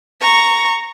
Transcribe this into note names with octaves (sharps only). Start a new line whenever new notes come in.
A#5 C#6